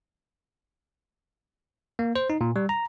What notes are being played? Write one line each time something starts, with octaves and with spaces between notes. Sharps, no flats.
A#3
C5
D#4
A#2
G3
A#5